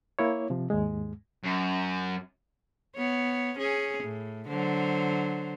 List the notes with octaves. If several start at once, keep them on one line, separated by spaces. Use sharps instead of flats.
A#3 E4 C#5
C3 F3
D#2 G#2 G#3
F#2
B3 C#5
C#4 G#4
A2
D3 F#3 C5